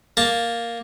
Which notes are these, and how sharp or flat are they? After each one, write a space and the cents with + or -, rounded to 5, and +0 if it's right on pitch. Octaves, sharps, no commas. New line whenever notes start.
A#3 +0 A5 +0